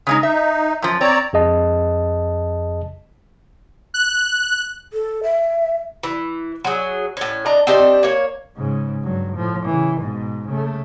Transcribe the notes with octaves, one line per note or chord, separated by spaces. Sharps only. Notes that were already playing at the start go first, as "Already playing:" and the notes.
C#3 G#3 D#4
D#4 E5
F#2 F3
C4 C#5 D5 A#5
F2 G#4 D#5 A5
F#6
A4
E5
E3
F#3 G#4
A2 C#4
D4 D#5 A#5
C4 D4 G4 D#5
A#3 C#5
G#2 C#3
G2 F#3
A2 F3
C#3 E3
G#2 B2
C#3 A3